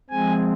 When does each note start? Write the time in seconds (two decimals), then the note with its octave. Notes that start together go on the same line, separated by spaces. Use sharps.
0.10 F3 G#3 C4 G#5